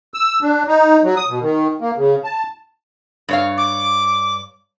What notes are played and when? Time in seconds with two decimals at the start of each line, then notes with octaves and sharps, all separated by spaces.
0.14 E6
0.42 D4
0.67 D#4
1.04 F#3
1.17 D#6
1.28 B2
1.42 D#3
1.81 A#3
1.97 C#3
2.24 A5
3.29 G2 C#5 F5
3.57 D6